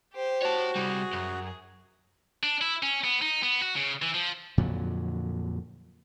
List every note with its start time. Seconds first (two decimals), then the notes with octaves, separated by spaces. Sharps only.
0.13 G4 C5
0.42 F#4 C#5 A5
0.75 C2 G3 G#4
1.13 F#2
2.43 D4
2.61 E4
2.83 C#4
3.04 B3
3.22 D#4
3.43 B3
3.62 F#4
3.76 C#3
4.02 E3
4.14 F3
4.58 F2 A#2 D3 F#3